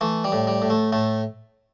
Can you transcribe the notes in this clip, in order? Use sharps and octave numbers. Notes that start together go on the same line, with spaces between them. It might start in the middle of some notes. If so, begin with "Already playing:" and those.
E3 A3
G3
A2
G3
A2
A3
A2 A3